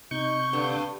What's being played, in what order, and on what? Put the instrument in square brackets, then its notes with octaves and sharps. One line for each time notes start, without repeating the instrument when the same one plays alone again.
[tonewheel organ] C3 G6 [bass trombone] D#4 [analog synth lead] C#6
[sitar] G2 [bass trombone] D3